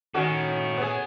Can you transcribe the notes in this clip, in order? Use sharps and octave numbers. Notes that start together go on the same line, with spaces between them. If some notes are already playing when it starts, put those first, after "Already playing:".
D#3 C#4 F#4 A4 C#5
B3 G#4